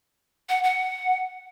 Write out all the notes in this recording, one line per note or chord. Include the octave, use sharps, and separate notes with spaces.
F#5
F#5